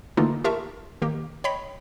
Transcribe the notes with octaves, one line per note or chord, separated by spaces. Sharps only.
D3 E3 A3 A#3 D#4 F4
F4 G4 A#4 E5 A5 C#6
D#3 A#3 G4
C#5 D#5 G5 B5 B6